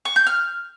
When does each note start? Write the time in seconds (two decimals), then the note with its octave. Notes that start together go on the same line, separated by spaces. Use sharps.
0.05 C#6
0.16 G6
0.27 F6